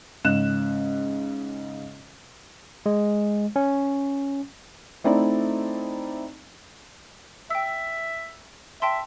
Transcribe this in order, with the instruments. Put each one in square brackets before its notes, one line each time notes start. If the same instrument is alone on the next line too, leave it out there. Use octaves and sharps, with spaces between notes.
[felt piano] G#2 C#3 F#6 E7
[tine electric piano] G#3
C#4
[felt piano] A3 C4 D#4 E4 D5
[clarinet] E5 [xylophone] G5 E6
[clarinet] E5 [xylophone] G5 A5 C6